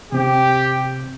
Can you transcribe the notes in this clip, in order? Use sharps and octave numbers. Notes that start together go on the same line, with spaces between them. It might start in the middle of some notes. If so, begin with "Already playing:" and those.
C3 C4 G4